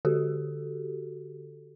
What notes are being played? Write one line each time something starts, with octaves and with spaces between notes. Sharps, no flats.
D3 F#4 G4 A4